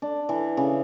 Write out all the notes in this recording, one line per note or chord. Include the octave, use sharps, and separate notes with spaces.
D4
E3
C#3